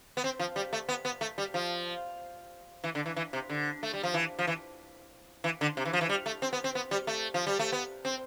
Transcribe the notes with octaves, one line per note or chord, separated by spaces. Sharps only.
B3
C4
F3
G3
A3
B3
B3
A3
G3
F3
E3
D3
E3
E3
C3
D3
A3
G3
F3
E3
F3
E3
E3
D3
C3
E3
F3
E3
G3
A3
C4
B3
C4
B3
G3
A3
F3
G3
A3
B3
C4